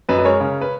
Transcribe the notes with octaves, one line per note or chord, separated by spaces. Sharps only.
F#2 B4 D#5
B4
G#3 A#4 C#5
C#3
B4